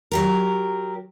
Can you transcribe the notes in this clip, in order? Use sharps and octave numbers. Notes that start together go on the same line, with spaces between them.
F#3 G4 A#4